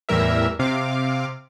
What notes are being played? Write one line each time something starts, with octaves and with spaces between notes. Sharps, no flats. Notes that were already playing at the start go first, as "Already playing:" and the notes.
E2 A2 E3 G3 A#4 E5
C3 F5 D6